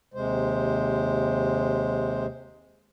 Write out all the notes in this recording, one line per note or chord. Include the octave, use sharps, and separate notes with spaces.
D#2 C3 G#3 C5